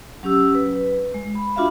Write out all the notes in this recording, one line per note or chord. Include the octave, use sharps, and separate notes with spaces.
F#3 C#4 G4 E6
B4
G#3
B5
D4 F4 F#4 E5 F5 B5